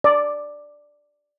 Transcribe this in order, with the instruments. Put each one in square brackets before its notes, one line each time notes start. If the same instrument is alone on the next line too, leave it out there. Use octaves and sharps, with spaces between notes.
[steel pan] D5